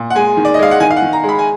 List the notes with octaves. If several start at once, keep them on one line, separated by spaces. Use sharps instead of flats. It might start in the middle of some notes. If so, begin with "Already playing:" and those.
Already playing: A#2
F#5
G#3 G#5
D#3
D5
D#5
G#3 F5
F#5
D#3 G#5
F5
F#5
D#3
A#5
G#3
B5
G#5